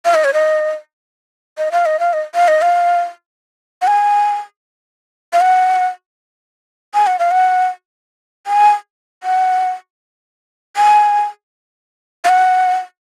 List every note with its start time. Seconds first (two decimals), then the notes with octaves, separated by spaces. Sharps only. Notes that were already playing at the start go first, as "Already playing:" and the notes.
0.05 F5
0.14 D#5
0.24 C#5
0.34 D#5
1.58 D#5
1.72 F5
1.86 D#5
2.00 F5
2.13 D#5
2.35 F5
2.48 D#5
2.62 F5
3.82 F#5
3.87 G#5
5.33 F5
5.41 F#5
6.94 G#5
7.07 F#5
7.19 F5
7.31 F#5
8.47 G#5
9.23 F#5
10.77 G#5
12.25 F5
12.29 F#5